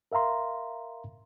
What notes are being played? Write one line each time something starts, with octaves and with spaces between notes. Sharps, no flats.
A#4 E5 F5 A#5 C6